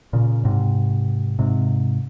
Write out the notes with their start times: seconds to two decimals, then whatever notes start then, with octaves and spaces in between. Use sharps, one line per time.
0.13 A#2 C#3
0.45 G#2 C3
1.39 G#2 C3